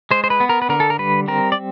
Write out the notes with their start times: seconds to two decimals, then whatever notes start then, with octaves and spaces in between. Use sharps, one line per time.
0.11 G#3 C5
0.24 C5
0.30 B4
0.40 B3
0.49 A#4
0.62 B4
0.69 D3 A#4
0.80 A4
0.90 A#4
0.99 G3 B4
1.28 C4 A#4
1.52 D5